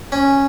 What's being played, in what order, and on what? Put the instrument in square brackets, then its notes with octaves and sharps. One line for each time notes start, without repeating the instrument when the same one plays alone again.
[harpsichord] C#4